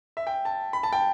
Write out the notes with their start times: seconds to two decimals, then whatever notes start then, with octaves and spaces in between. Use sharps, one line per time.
0.17 E5
0.27 G5
0.45 A5
0.73 B5
0.83 A5
0.93 G5